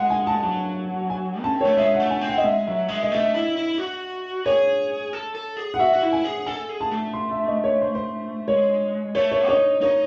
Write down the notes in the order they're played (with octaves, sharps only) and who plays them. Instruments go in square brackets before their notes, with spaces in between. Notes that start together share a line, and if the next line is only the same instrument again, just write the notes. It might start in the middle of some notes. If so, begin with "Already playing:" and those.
Already playing: [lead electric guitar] G#3 [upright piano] F#5
[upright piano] G#5
A5
[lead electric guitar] F#3 [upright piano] A5
[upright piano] G#5
[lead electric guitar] C#4 [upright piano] A5
[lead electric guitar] C4
[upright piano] C#5
[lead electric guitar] A3
[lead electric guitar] G#3 [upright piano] E5
[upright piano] F#5
[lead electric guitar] A3
[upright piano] G#5
[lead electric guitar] C4
[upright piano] F#5
D#5
[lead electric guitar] G#3 [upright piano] E5
[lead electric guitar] F#3 [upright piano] E5
[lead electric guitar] G#3 [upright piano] E5
[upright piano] D#5
[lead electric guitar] A3 [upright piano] E5
[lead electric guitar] E4
E4
F#4
[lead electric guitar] G#4 [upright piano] C#5
[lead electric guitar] A4
A4
G#4
[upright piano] F#5
[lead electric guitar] F#4 [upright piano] E5
[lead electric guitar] F#4
E4
[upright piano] G#5
[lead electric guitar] G#4
[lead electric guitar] A4 [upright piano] G#5
[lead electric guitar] G#4
[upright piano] A5
[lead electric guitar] A3
[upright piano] C6
E5
D#5
C#5
C5
C5
[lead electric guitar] G#3 [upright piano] C#5
[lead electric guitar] A3 [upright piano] C#5
[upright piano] C#5
[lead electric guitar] D#4 [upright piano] C#5
[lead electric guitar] D#4 [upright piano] C#5